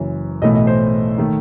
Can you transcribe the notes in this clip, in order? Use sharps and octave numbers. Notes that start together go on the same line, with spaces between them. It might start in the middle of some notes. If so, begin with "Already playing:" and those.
Already playing: F#1 F#2 E3
B1 A2 E3 A3 D#5
D#5
C5
D#3 A3